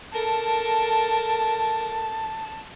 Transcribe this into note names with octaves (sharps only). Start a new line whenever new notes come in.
A4 A#4 A5